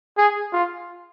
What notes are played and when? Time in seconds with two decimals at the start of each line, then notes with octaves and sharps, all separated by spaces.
0.17 G#4
0.53 F4